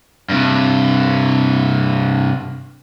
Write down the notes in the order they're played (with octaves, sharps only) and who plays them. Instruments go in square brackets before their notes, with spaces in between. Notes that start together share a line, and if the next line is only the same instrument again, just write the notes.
[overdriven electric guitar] G2 C3